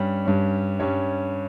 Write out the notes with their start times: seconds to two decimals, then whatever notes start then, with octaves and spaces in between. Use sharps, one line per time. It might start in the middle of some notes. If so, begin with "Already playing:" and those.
Already playing: G2 G3 C#4
0.25 G2 G3 C#4
0.80 G2 G3 C#4 C#5